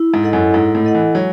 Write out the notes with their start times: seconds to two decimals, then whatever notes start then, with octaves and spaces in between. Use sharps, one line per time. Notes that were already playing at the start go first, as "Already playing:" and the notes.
Already playing: E4
0.14 G#2
0.23 A4 D#5 F#5
0.33 F#2
0.54 G#2 E4
0.75 A2
0.85 A4 D#5 F#5
0.95 E3
1.15 F#3 G#3